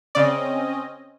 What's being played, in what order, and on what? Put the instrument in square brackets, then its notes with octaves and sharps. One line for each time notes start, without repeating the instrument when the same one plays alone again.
[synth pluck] C#3 D5 [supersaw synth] C4 C#4 D#5